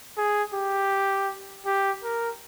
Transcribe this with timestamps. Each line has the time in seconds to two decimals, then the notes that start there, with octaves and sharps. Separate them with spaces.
0.17 G#4
0.55 G4
1.66 G4
2.04 A#4